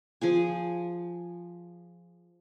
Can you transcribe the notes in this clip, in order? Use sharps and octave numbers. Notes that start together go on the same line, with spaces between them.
F3 G#4 G#5